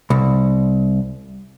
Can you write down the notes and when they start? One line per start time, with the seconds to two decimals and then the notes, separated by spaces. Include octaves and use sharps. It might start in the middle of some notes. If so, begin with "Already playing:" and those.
0.10 C2